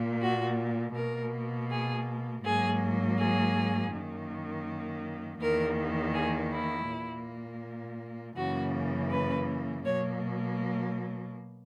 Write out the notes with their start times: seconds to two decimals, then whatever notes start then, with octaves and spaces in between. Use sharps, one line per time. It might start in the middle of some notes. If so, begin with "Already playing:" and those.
Already playing: A#2 A#3
0.20 F#4
0.95 B2 A#3 A#4
1.69 G#4
2.43 G#2 F#3 A#3 G#4
3.17 G#4
3.91 F#2 D#3 A#3
5.39 E2 D#3 A#3 A#4
6.13 G#4
6.50 E4
6.87 A#2 A#3
8.36 F#2 C#3 E3 A#3 F#4
9.10 B4
9.84 B2 F#3 A#3 C#5